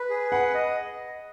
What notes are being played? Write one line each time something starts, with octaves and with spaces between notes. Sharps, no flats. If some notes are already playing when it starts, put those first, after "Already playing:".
Already playing: B4
G#4
B4 F#5
D#5